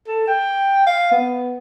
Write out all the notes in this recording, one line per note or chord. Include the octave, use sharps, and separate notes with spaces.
A4
G5
F5
B3